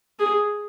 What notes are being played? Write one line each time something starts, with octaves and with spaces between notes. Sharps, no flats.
G#4